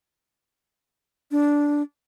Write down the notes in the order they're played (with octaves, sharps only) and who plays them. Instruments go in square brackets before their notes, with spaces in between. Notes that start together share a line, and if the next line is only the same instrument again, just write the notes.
[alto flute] D4